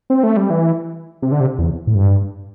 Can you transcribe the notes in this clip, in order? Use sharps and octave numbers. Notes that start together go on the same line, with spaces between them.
C4
A3
G3
E3
C3
D3
C3
E2
A2
G2